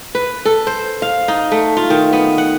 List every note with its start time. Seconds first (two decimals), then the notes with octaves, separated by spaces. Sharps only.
0.15 B4
0.45 A4
0.67 C5
1.02 F5
1.28 D#4
1.52 A3
1.77 F4
1.90 D#3
2.13 B3
2.38 F#5